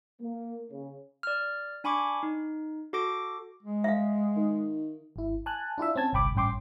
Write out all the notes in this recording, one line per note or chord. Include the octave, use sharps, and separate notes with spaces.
A#3
C#3
D5 F6
D4 G#5 B5 C#6 D6
D#4
F#4 A4 D6 A#6 D7
G#3
E5 F5
D#3
G#1 E4
G#5 A5 F#6
D4 E4 F4 E5
C4 C#4 A5 G#6
G1 C2 G5 B5 D6
A1 G2 C#4 G5 C6 D6